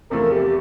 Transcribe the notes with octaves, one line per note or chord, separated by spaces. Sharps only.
E2 C3 F3 A3 E4 A#4
G4